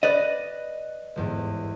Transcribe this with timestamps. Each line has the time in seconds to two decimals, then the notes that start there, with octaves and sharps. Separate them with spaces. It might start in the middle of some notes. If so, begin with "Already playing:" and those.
0.03 B4 D5 D#5 A#6
1.16 G1 E2 G#2